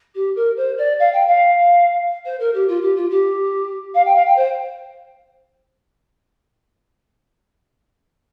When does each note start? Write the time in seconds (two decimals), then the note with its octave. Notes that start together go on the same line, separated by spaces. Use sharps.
0.14 G4
0.35 A#4
0.56 C5
0.77 D5
0.99 F5
1.12 G5
1.27 F5
2.25 C5
2.39 A#4
2.53 G4
2.67 F4
2.82 G4
2.95 F4
3.10 G4
3.94 F5
4.05 G5
4.15 F5
4.25 G5
4.36 C5